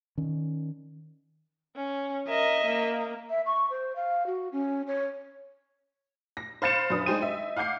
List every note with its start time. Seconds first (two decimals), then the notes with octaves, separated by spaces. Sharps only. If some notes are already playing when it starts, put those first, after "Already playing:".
0.18 D#3 C#4
1.76 C#4
2.28 A#4 D#5 E5
2.65 A#3
3.30 E5
3.46 C#6
3.70 C5
3.96 F5
4.26 F#4
4.52 C#4
4.87 C#5
6.37 A#6
6.62 C5 F5 B5 A6 C#7 E7
6.90 F#2 D4 B4 D#6
7.06 G#3 D#4 G#4 C5 G5 D#7
7.22 D#5 E5
7.57 F5 F#5 D6 G6 C7